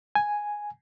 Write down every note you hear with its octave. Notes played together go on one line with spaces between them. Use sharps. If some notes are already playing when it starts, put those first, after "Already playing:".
G#5